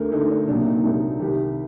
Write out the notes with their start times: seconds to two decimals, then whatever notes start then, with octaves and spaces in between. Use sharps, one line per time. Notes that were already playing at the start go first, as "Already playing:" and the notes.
Already playing: D2 D3 A3 A#4
0.12 D2 D3 A3 D#4
0.30 D4
0.48 C2 A#2 F#3 D4
0.66 D#4
0.84 C2 A#2 F#3 D#4
1.20 C2 C3 D#3 G4